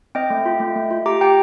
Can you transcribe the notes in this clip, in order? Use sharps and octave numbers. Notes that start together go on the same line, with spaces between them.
C4 D#5 G5
A3
F4
A3
A3
F4
G4 A#5 D6
G4 G5 A#5